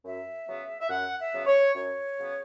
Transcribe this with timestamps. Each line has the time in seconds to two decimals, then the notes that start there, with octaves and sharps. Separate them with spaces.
0.05 F#2 E5
0.48 C#3 F#3 B3
0.81 E5
0.90 F#2 F#5
1.19 E5
1.33 C#3 F#3 B3
1.47 C#5
1.75 F#2 C#5
2.18 C#3 F#3 B3